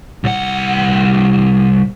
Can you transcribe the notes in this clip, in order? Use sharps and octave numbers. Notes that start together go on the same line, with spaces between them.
C2 F#5